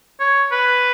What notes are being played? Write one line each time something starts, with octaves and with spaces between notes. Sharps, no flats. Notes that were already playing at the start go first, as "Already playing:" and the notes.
C#5
B4